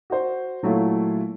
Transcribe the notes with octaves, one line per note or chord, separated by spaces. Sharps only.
F#4 C5
A#2 F#3 A3 E4 F4